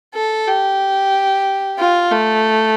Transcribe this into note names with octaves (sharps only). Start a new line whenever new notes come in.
A4
G4
F4
A3